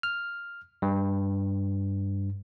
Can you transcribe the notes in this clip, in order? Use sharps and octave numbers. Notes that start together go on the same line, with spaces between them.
F6
G2